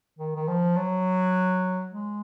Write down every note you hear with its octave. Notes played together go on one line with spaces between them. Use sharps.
D#3
D#3
F3
F#3
G#3